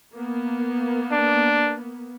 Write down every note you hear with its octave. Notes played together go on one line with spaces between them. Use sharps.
A#3 B3
D4